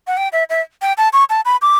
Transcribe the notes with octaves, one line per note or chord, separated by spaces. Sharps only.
F#5
G5
E5
E5
G5
A5
C#6
A5
B5
D6